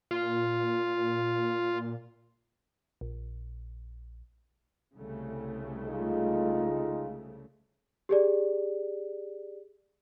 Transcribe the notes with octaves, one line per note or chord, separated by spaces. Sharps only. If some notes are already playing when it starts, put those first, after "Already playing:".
A#2 F4
A#1
C2 C#3 A3
G#3 D#4 F4
G4 G#4 D5